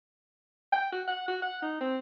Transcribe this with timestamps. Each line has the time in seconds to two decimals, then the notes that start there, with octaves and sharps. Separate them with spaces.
0.72 G5
0.92 F#4
1.08 F#5
1.28 F#4
1.42 F#5
1.62 D#4
1.81 C4